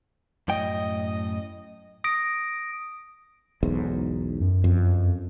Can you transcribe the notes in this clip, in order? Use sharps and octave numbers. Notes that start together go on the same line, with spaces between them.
F#2 A2 D#5 G5
D#6 A#6 D7
B1 E2 G#2
F#2
F2